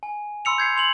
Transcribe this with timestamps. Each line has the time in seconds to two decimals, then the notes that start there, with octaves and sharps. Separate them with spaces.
0.03 G#5
0.45 B5 C6 E6 C#7 F7
0.58 G6 G#6 C7 C#7
0.76 C6 F7 F#7